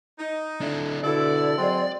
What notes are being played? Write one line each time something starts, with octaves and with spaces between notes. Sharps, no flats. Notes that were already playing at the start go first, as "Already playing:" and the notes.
D#4
D3 D4 E4
B2 D3 E4 A4 D5
F#3 G#3 C4